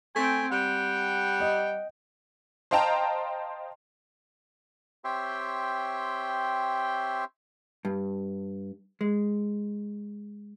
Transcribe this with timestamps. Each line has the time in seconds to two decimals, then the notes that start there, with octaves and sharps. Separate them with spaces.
0.16 A3 C4 G5 G#5
0.52 G3 F#5 G5
1.40 D#5
2.71 C5 D#5 F5 G5 A5 A#5
5.04 C4 G4 C#5 E5 G5 C6
7.85 G2
9.01 G#3